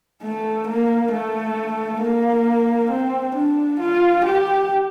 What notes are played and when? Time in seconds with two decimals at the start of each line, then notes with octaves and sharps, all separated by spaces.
0.23 A3
0.68 A#3
1.12 A3
2.01 A#3
2.90 C4
3.35 D4
3.80 F4
4.25 G4